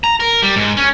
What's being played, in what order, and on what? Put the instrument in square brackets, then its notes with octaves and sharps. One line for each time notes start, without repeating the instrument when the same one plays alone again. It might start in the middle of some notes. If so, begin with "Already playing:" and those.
[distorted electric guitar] A#5
A#4
G3
G#2
C#4